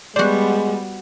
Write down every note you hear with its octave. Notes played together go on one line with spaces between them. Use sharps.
G3 G#3 B3 F#4 C5 D5 F#5